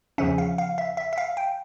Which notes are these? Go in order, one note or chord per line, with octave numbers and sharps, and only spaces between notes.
E2 C#3 F3 C#4 E5
F5
F5
E5
E5
E5
F5
G5